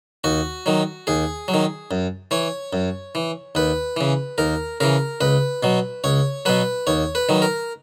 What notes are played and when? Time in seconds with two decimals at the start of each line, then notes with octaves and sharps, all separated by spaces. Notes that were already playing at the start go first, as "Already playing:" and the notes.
0.24 D#2 F#4
0.66 D#3 F#3
1.07 D#2 G#4
1.48 F#3
1.54 D#3
1.91 F#2
2.31 E3 C#5
2.73 F#2
3.15 E3
3.55 D#2 B4
3.97 C#3 E3
4.38 D#2 A#4
4.80 C#3 E3 A#4
5.21 C#2 B4
5.63 B2 F#3
6.04 C#2 C#5
6.45 B2 F#3 B4
6.87 D#2 C#5
7.15 B4
7.29 D#3 F#3
7.42 A#4